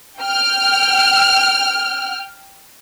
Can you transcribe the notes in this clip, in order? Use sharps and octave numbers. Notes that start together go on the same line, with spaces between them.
G5 F6